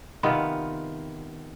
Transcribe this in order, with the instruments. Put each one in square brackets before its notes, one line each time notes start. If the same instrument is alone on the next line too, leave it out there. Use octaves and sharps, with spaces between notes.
[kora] C3 D#3 B3 F4